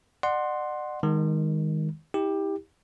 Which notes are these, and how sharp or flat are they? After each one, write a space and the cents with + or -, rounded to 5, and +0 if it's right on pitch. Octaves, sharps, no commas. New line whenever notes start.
D5 +40 F#5 +0 C6 +5
D#3 +10 G#3 -20
E4 -40 G4 +15